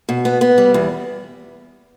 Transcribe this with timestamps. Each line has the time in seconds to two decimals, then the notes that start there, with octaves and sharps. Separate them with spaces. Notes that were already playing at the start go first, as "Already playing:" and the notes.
0.09 B2
0.25 B3
0.41 B3
0.58 G3
0.74 E2